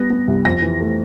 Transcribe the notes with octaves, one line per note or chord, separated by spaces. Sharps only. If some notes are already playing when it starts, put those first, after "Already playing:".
Already playing: G3 B3 A#6
B3
C2
F2 A#6
E3
A3